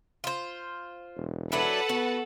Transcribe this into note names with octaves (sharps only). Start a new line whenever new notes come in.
F4 C5
E1
F#3 D4 E4 A4 B4 F#5 A5
B3 F#4